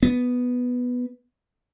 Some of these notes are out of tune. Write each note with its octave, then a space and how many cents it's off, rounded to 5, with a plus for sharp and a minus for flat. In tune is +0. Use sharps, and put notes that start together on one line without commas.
B3 +0